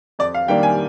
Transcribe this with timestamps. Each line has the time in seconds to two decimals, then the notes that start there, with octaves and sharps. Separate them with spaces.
0.19 F2 D5
0.34 F5
0.48 D#3 G3 A#3 D4 G5
0.63 G#5